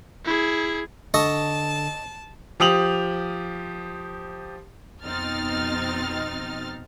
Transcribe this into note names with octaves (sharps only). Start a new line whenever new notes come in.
E4 G#4
D3 A4 D#5 A5 C#6
F3 G4 D#6 F7 F#7
F2 B2 C4 D#4 F6 A6